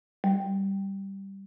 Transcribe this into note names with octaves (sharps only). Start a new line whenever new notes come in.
G3